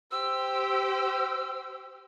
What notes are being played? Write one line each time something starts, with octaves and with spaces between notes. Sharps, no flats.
G4 C5 E6